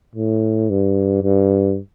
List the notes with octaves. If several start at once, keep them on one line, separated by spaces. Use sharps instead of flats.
A2
G2
G2